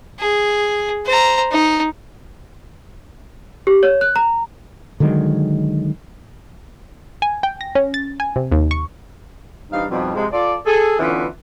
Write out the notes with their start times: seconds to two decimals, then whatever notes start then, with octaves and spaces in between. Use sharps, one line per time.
0.19 G#4
1.05 C5 A#5
1.51 D#4
3.67 G4
3.83 C#5
4.01 F#6
4.16 A#5
5.00 D3 D#3 F#3 G#3
7.22 G#5
7.43 G5
7.61 A#6
7.75 C#4
7.94 A6
8.20 G#5
8.36 C3
8.52 D#2
8.71 C#6
9.71 G2 E3 C4 D#4 F5
9.90 F2 B2 F3 G3 D#4
10.15 C3 F3 G#3
10.32 F4 A4 D5
10.66 G#4 A4
10.99 D3 E3 B3 C#4 F4